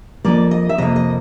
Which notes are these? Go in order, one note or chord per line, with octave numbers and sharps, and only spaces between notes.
F2 C3 F3 A#3 D5
D#5
E5
F2 C3 F3 A#3 D#5
D#5